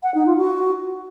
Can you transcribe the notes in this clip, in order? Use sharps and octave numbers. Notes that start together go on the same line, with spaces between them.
F#5
D#4
F4
F#4